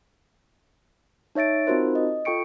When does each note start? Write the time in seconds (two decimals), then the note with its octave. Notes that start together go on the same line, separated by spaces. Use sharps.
1.35 D#4 C#5 E5 A6 D7
1.67 C4 D#4 F4 F#4 A#4 C5
1.95 D#5
2.25 F4 A4 G5 C#6 C#7 D7